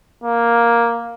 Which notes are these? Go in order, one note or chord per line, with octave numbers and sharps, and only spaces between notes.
A#3